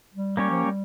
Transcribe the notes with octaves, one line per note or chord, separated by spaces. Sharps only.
G3
G3 A#3 C#4 G4 C#5
F3
G3